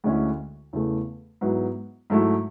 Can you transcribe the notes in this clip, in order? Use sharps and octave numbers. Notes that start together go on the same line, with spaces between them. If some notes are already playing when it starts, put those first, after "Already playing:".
D2 D3 G#3 C#4 E4
E2 C#3 E3 A3
G#2 F#3 B3 E4
G#2 F#3 A3 E4